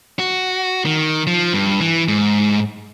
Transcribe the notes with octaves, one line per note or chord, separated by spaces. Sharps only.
F#4
D#3
F3
G2
E3
G#2